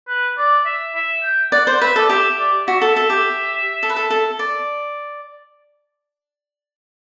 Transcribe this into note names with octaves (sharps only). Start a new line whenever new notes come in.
B4
D5
E5
E5
G5
D5 F#5
C5
B4 E5
A4 D5
G4 E5
D5
F#4 E5
A4
A4
G4
A4
B4
A4
A4
D5